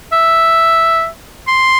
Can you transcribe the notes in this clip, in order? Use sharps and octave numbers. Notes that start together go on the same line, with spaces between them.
E5
C6